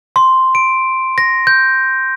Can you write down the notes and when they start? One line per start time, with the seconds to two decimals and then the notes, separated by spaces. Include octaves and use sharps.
0.16 C6
0.55 D7
1.18 A#6
1.47 G6